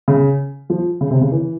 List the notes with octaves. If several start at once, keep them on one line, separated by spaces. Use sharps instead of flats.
C#3
F3
C#3
C3
C#3
E3